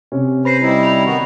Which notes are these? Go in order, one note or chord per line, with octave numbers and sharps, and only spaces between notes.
C3 C#4
B4 C5 B5 A#6 C7
G3 D#4 E4
B5 F7
D#3 B3 F#4